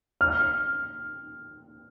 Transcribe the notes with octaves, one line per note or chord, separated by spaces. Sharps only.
F6